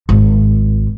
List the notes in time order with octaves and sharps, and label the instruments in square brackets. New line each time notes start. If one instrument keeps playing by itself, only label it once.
[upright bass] G#1